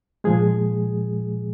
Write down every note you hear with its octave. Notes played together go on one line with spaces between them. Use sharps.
A#2 F3 G#3 G#4